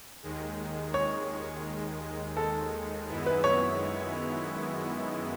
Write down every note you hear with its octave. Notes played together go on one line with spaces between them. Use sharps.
D#2 D#3 G#3
C#5
A4
F#2 D#3 G#3 B3 E4
B4
C#5